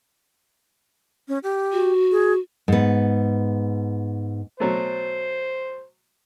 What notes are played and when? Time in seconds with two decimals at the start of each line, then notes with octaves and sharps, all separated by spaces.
1.28 C#4
1.43 G4
1.72 F#4
2.12 G#4
2.68 G#2 B3
4.60 B2 F#3 A3 C5